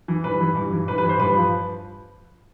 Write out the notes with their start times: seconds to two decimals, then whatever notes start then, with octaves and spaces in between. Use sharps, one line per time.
0.08 E3
0.24 G2 B4
0.41 E3
0.55 G2
0.72 E3
0.88 G2 B4
0.98 B4
1.03 E3
1.09 C5
1.19 G2 B4
1.35 F3